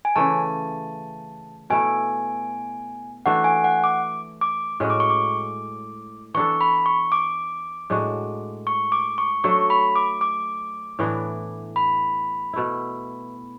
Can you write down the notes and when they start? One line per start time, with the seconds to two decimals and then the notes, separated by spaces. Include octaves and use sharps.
0.05 G#5
0.16 C#3 E3 A3 A5
1.70 B2 A3 E4 G#5
3.26 E3 A3 D4 F#4 F#5
3.44 G#5
3.64 F#5
3.84 D6
4.41 D6
4.80 A2 G#3 C#4 F#4
4.90 D6
5.00 C#6
5.10 D6
6.34 E3 B3 D4 A4 C#6
6.61 B5
6.86 C#6
7.12 D6
7.90 A2 G#3 D4 F#4
8.67 C#6
8.92 D6
9.18 C#6
9.44 F#3 A3 D4 A4 C#6
9.70 B5
9.96 D6
10.21 D6
10.99 A2 E3 B3 D4
11.76 B5
12.53 B2 A3 E4